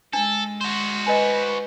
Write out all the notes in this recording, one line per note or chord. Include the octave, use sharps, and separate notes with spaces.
G#3 D4 A4
F#4 C5
B4 D#5 G#5